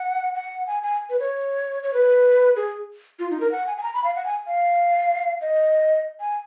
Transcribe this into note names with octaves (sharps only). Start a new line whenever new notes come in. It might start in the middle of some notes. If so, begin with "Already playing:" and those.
Already playing: F#5
F#5
G#5
G#5
B4
C#5
C#5
B4
G#4
F4
D#4
A#4
F#5
G#5
G#5
A#5
B5
F5
F#5
G#5
F5
D#5
G#5